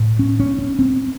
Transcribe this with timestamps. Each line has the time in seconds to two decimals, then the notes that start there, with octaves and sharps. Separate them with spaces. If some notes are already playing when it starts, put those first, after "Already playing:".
Already playing: A2
0.19 C#4
0.40 C#4
0.59 C#4
0.79 C4